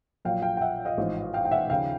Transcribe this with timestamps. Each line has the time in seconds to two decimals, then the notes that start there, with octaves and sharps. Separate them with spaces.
0.25 A#1 A#2 F#3 F5 G5
0.42 F5 G5
0.57 G5
0.61 E5 F#5
0.85 D#5 F5
0.98 A1 G#2 F3
1.34 F5 G5
1.45 G5
1.51 E5 F#5
1.70 D#2 C#3 F3 F5 G5